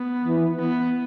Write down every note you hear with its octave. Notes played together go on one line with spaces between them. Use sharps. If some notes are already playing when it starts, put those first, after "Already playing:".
Already playing: B3
E3
B3